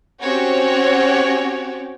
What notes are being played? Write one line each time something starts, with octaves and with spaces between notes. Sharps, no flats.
C4 C#4 F#4 G4 C#5